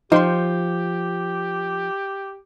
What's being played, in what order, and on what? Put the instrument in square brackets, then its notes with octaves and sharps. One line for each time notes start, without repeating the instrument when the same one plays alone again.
[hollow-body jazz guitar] F3 [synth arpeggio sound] D#4 G5 C6 [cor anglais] G4